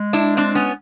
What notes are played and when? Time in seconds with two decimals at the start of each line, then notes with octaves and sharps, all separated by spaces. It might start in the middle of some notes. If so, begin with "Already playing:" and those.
Already playing: G#3
0.13 D4 E4
0.37 C4 D4
0.55 B3 C#4